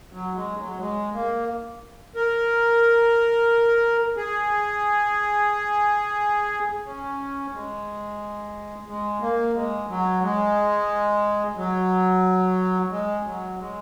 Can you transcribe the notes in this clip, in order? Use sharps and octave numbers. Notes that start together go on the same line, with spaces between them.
F#3
G#3
F#3
G#3
A#3
A#4
G#4
C#4
G#3
G#3
A#3
G#3
F#3
G#3
F#3
G#3
F#3
G#3